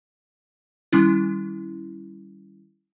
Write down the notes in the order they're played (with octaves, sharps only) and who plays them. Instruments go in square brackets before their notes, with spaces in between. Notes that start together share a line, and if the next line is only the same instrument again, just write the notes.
[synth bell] D#3 G3 C#4 E4